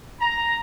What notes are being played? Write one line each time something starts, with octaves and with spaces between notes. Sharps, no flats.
A#5